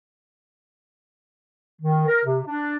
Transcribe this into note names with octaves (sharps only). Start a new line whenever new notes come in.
D#3
A#4
C3
D4